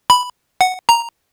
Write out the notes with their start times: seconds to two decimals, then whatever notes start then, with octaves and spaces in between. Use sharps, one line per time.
0.10 B5
0.61 F#5
0.89 A#5